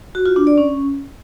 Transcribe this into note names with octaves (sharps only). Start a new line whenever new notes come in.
F#4
F4
D4
D5
C#4